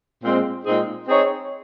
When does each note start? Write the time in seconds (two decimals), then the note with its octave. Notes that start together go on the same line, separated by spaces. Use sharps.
0.23 A#2 G#3 C4
0.65 A#2 G#3 C4 D#4 G#4
1.08 C4 D#4 G#4 C#5